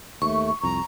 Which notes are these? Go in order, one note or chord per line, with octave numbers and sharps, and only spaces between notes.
D#2 A3 C#6
C2 F2 A#5